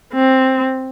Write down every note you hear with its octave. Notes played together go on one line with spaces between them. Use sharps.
C4